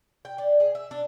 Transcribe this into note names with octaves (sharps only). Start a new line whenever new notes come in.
G5
D4
G#4
E5
D4